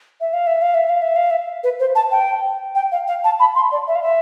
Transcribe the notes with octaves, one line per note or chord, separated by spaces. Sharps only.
E5
F5
E5
F5
E5
F5
E5
F5
E5
B4
C5
A5
G5
G5
F5
F5
A5
B5
C6
D5
E5
F5
E5